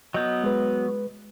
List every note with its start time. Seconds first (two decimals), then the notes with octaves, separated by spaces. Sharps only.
0.14 F#3 B3 D#5 G6
0.44 G#3 B4